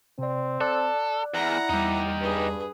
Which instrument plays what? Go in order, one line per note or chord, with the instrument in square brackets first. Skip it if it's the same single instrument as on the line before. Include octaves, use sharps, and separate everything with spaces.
[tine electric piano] C3 D5 [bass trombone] C4
[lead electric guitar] A4 [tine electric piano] D5 D6 F#6
[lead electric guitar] E2 [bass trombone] E4 [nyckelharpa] F#5 A#5
[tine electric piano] E2 G3 [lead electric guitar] D#4 G4
[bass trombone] G2 [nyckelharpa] G#4 B4